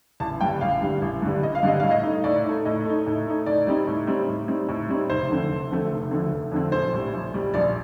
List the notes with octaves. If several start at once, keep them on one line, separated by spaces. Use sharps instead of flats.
A1 A5
G2 D3 G3 G5
A1 F5
G2 D3 G3
A1
G2 D3 G3
A1 D#5
F5
G2 D3 G3 D#5
A2 F5
D#5
A3 D#4
A2 D5
D#4
A3
A2 D#5
A3 D#4
A2
A3 D#4
A2 D5
G3 C4 D#4
A2
G3 C4 D#4
A2
G3 C4 D#4
A2
G3 C4 D#4
F1 C5
F2 D3 A3 C4
F1
F2 D3 A3 C4
F1
F2 D3 A3 C4
F1
F2 D3 A3 C4
A#1 C5
A2 G3
A#1
A2 G3
A#1 D5